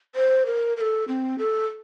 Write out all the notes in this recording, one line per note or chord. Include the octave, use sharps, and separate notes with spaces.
C5
A#4
A#4
A4
C4
A4